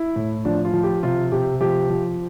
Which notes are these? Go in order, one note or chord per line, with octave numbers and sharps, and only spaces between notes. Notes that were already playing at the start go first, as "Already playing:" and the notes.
Already playing: E4
A2
F3 D4
F4
F3
G4
C3 F4
C3 G4
F3 G4
F3